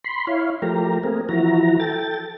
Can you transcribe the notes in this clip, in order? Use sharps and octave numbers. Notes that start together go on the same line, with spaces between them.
B5 C6
E4 C#5 F5
F3 A3 G4 A#4 A#5
A3 A#3 C4 G#4 A#4
E3 F3 E4 F#4 A#5
A4 G5 A6